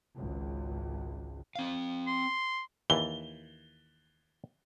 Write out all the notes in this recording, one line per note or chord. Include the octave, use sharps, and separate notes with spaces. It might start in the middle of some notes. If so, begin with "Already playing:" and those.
G#1 C#2
C4 F5
C6
D#2 E3 G7